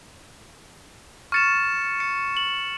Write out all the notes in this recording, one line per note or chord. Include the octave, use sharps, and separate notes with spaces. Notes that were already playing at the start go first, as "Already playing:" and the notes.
C#6 F6 A6 C#7 E7
C#7
F#7